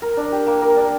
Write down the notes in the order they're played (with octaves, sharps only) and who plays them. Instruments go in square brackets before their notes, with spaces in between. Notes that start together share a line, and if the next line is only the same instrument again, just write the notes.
[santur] A#4
D4
G4
A#3
A#4
D4